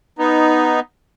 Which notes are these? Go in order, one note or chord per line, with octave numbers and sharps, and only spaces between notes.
B3 D#4